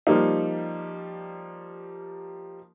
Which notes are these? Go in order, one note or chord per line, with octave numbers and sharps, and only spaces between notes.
F3 G3 A#3 D#4